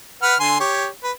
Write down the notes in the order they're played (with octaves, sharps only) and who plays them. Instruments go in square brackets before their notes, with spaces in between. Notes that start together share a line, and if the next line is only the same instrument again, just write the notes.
[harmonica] B4 F#5 F6
D3 G#5 C6
G4 C#5
B4